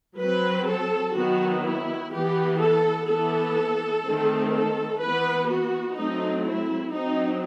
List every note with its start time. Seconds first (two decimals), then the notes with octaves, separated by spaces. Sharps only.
0.19 F#3 C4 B4
0.67 A4
1.15 D#3 F#3 B3 F#4
1.63 E4
2.12 E3 B3 G4
2.60 A4
3.08 E3 B3 A4
4.04 D#3 A3 C4
4.53 A4
5.00 E3 B3 B4
5.49 F#4
5.97 F#3 A3 C4 D#4
6.46 E4
6.94 F#3 C4 D#4